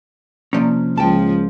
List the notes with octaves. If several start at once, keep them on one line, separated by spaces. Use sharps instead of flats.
C3 F3 A#3 C#4 D5
C#2 F3 G5 A5